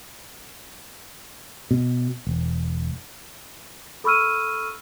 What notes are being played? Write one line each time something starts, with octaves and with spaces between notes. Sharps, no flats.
B2
E1
A4 B5 C#6 E6 F6 D#7